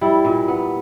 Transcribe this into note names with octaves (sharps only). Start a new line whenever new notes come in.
G3 E4
A#2
B3